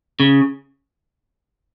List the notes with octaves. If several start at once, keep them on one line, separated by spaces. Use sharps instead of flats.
C#3